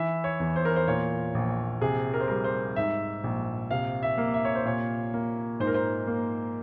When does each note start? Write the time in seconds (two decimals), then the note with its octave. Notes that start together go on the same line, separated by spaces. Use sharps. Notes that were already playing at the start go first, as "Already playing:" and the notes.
Already playing: E3 E5
0.24 C#5
0.40 E2
0.56 C5
0.65 A#4
0.76 C5
0.88 A#2 C#5
1.35 A#1
1.81 C3 G#4
2.14 A#4
2.20 C5
2.28 G3 A#4
2.44 C5
2.76 G#2 E5
3.24 A#1
3.71 C3 F5
4.03 E5
4.18 A#3
4.34 E5
4.45 C#5
4.55 C5
4.65 A#2 C#5
5.13 A#3
5.60 G#2 C5
5.67 A#4
5.74 C5
6.07 A#3